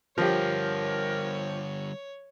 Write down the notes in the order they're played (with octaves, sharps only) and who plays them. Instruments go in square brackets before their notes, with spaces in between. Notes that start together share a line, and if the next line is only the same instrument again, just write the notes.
[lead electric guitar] D3 G3 [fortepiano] F3 G4 [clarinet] A#4 [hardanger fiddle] C#5